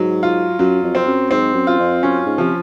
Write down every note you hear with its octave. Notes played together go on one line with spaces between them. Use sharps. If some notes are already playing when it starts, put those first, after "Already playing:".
Already playing: G#2 F#3
F4
F#2 F#3
F2
C4
F#2
G#2 C4
F#2
F4
F2
F#2 C#4
G#2
C3 F3